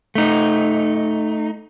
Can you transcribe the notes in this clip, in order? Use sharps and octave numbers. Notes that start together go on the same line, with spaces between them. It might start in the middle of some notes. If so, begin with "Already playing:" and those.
A3 D#4